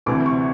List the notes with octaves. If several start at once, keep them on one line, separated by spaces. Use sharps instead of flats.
D2 C3 E3 D6
C#6